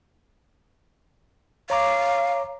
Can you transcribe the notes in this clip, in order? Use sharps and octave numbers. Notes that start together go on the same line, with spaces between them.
C#5 F5 A#5 D6